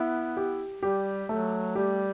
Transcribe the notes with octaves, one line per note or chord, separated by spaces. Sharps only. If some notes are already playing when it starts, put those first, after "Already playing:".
Already playing: B3 E4
G4
G3 G4
F#3 A3
G3 G4